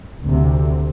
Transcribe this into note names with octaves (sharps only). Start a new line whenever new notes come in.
D2 C3